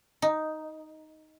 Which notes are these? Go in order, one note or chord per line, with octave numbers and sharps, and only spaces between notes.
D#4